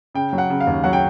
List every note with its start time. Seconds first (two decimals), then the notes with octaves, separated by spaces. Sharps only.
0.15 C#3 G5
0.33 F#3
0.38 F#5
0.50 C#3
0.60 F5
0.67 D#2
0.84 F#3 F#5
0.93 G5